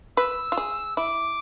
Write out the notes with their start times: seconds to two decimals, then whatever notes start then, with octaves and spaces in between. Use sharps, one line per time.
0.17 B4 E6
0.52 F4
0.57 G#4
0.97 E4 D6